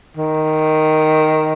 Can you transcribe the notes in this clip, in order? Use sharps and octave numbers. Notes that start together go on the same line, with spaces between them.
D#3